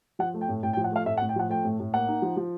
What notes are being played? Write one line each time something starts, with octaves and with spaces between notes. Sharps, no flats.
F3 F#5
A3
G5
A2
A2 G5
G5
F3
F#5
A3 F5
A2 E5
F#5
A2
G5
F3 F#5
A3 G5
A2
A2
A#3 F#5
D#4
F3
F3